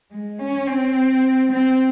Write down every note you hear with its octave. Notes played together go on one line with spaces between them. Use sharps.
G#3
C#4
C4
C4